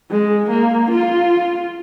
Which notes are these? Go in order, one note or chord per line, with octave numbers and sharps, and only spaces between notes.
G#3
A#3
F4